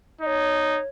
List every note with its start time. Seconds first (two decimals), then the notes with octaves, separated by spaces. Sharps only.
0.21 D#4 D#5
0.26 C#5